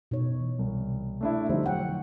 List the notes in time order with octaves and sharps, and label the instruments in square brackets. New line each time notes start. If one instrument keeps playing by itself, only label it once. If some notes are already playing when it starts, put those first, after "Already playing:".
[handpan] B2 D#4 C#5
E3
[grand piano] C2
A3 D4 E4
[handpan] D3 F3 A3 [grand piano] G3 C4 D#4
[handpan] F#3 C#5 F#5 [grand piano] G5